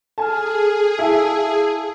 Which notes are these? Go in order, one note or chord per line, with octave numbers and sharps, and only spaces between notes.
G#4 A4 G#5 A5 F6
E4 A4 F5 G#5 A5 E6